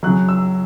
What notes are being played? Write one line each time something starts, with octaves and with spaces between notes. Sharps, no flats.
C#3 F#3 F#6
E6